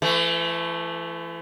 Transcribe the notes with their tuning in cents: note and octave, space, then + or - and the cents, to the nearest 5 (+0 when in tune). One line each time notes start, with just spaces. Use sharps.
E3 +40 A3 +0